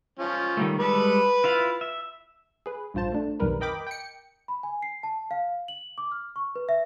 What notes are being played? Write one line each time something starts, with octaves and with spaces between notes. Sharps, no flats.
F3 C#4
D#3 G3 A3
G3 G#3 A4 B4 B5
E4 F4 F5
E5
G#4 B4
A#1 G2 F4 C5 A5
A3 D4
B1 F2 D#3 G3 A#4 B4
A#4 D#5 G5 B5 D6
G5 C#7
B5
G#5
C7
A5
F5
F#7
D6
F6
C#6
B4
E5